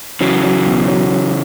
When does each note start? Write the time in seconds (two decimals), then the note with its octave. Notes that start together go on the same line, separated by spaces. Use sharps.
0.20 C#3 E3 F#3
0.43 F#3
0.66 B1
0.88 F#3
1.11 C#4